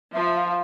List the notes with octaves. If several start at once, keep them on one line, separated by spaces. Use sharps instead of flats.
F3 E5
E5
F5
F5